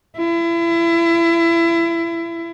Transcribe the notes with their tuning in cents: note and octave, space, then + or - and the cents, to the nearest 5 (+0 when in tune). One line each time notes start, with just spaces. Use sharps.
E4 +30